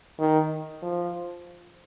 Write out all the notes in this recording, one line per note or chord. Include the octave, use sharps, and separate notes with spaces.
D#3
F3